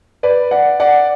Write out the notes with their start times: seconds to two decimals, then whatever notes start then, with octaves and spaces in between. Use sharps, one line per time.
0.23 B4 D5
0.51 D5 F#5
0.80 D5 F#5